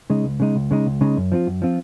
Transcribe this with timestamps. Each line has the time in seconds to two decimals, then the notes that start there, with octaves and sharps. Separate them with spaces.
0.10 C#3 G#3 D#4
0.24 C#2
0.40 C#3 G#3 D#4
0.56 C#2
0.71 C#3 G#3 D#4
0.87 C#2
1.01 C#3 G#3 D#4
1.17 F#2
1.32 F3 C4 F4
1.47 F#2
1.62 F3 C4 F4